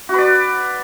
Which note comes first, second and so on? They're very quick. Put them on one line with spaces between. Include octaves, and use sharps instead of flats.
F#4 B4 D5